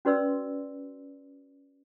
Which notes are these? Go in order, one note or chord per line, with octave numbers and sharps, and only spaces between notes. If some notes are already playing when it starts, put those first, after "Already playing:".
C#4 F#4 B4 D5 C6 E6